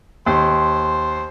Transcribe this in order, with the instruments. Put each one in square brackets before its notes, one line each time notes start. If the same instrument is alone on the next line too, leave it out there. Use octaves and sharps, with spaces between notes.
[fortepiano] D#2 [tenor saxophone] C5